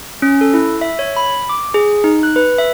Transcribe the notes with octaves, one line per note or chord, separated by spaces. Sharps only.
C#4
A4
E4
E5
C#5
B5
D6
G#4
D#4
F#6
B4
E5